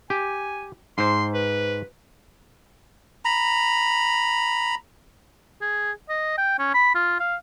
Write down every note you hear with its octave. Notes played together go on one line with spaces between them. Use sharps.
G4 G#5
G#2 C5 C6
B4
A#5 B5
G#4
D#5
G5
C#4
B5
F4
F5